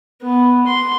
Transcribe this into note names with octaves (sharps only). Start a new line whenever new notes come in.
B3
C6